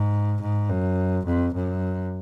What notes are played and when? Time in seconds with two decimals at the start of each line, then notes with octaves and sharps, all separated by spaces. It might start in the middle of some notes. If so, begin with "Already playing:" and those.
Already playing: G#2
0.41 G#2
0.70 F#2
1.26 F2
1.55 F#2